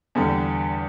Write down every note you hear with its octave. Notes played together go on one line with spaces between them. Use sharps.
E2 D3 G3